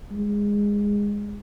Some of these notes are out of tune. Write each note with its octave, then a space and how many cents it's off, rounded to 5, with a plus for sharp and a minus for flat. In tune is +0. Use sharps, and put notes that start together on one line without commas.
G#3 -15